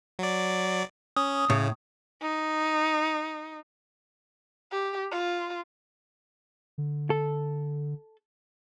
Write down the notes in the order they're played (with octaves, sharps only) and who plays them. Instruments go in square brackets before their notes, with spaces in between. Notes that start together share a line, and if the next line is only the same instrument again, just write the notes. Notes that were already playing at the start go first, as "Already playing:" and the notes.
[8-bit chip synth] F#3 D5
[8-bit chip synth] C#4 [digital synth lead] D#6
[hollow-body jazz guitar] A2 [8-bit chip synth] C#3
[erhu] D#4
G4
F4
[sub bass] D3
[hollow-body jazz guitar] A4